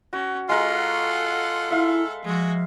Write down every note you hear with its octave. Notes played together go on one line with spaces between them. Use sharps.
C#4 F#4
G#3 F4 A4 A#4 F#5
E4 E5 F5
F3 G#3 F#4